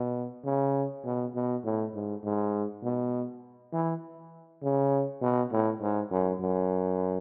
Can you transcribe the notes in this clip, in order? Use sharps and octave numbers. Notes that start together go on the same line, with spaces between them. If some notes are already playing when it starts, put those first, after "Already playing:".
Already playing: B2
C#3
B2
B2
A2
G#2
G#2
B2
E3
C#3
B2
A2
G#2
F#2
F#2